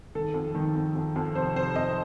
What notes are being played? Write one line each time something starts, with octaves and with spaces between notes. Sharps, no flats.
D#3 A4
F2
D#3
F2
F2
F2
C3 C5
C3 C5
F2 D#5